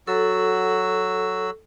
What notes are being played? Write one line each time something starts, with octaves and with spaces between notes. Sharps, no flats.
F#3 F#4 A4 E6